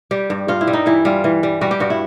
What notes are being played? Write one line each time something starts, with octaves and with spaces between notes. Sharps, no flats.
G3 G4
G2
G2 F4
E4
G3
D#4
E3 E4
G3 F4
E3
G3
G3 F#4
G4
G2 F#4
E4